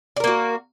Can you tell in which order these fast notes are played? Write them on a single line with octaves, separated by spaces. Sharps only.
D5 A#4 A#3 F#4